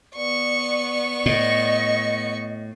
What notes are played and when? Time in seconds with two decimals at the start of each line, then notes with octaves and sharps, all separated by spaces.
0.16 B3 D5 C#6
1.26 A2 D#5